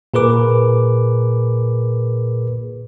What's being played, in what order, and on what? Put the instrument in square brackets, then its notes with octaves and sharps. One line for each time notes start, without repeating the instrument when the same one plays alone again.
[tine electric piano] A#2 G#4 A#4 B4 D6